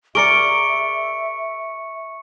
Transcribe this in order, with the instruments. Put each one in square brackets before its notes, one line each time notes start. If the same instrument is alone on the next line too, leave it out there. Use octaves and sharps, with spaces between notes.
[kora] G#4 A#4 D5 [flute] E5 [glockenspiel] C#6 C#7 [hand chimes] D6 D7